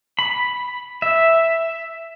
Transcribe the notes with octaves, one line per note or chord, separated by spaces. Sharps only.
B5
E5